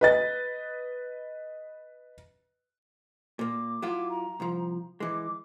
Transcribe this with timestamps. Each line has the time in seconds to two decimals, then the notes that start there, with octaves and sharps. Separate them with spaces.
0.01 B4 D#5 A6
3.39 A#2 A#3 D6
3.82 F#3 E4 F4
4.09 A#5
4.40 C2 F3
5.00 E3 G#3 D6